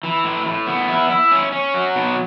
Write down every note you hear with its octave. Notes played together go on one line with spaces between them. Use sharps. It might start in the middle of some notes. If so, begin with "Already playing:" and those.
E3
A2
A2
B3
E4
E4
C#4
C#4
F#3
B2